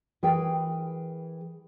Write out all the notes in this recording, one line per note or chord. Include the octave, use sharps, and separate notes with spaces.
E3 G#4 A#4 B4 G5